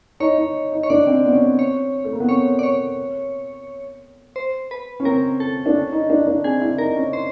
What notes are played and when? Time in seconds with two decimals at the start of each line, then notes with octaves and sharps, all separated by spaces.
0.20 D#4 C#5
0.38 D#4
0.72 D#4
0.83 C#5
0.90 D4 D5
1.07 C4
1.25 B3
1.33 C#4
1.42 C4
1.59 C#5
2.05 A3
2.12 A#3
2.20 B3
2.29 C4 C#5
2.59 D5
2.63 C#5
4.36 C5
4.71 B4
5.00 C#4
5.05 C4 A#4
5.40 A4
5.66 D4
5.75 C#4
5.92 D#4
6.10 D4
6.22 D#4
6.27 D4
6.44 C4 G#4
6.61 E4
6.78 D#4 A#4
6.96 C#4
7.13 C5